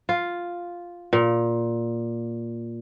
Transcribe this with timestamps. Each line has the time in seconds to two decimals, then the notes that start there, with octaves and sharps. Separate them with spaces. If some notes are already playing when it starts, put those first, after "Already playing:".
0.09 F4
1.13 A#2